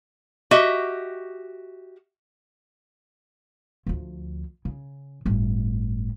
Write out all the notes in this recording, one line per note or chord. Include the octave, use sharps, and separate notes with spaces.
F#4 G4 D#5 E5
D2 F3
C#3
G1 A2